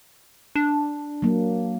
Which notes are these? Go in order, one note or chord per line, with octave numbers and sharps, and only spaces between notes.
D4
F#3 A#3